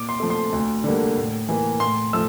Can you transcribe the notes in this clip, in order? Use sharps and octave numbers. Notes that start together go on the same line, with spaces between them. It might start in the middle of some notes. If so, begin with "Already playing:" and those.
Already playing: A#2 D6
C6
F3 A3
C6
D2
D3 G3 A#3
A2
E3 A#3
A2 C6
F3 A3 E6